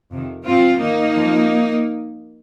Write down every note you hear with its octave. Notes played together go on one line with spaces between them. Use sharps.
F2 C3 D#3
G#2 F3 C4 F4
D#2 D#3 A#3 D#4
F2 F3